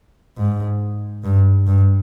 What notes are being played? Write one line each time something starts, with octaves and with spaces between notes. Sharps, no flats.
G#2
G2
G2